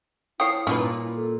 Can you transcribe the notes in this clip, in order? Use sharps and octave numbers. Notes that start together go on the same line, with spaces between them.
F3 E4 C#5 G5 D#6 C7
A#2 C#4 D#4 B4
A4